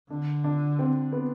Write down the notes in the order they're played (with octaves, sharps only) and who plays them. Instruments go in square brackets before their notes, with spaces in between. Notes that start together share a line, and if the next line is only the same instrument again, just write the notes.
[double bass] D3 [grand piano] D4
[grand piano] D4
C4
B3